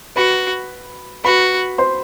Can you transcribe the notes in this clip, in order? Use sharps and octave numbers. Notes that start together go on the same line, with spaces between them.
F#4 B4 B5
F#4 B4 B5
C5 C6